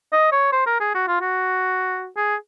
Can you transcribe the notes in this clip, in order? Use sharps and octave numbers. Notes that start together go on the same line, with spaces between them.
D#5
C#5
C5
A#4
G#4
F#4
F4
F#4
G#4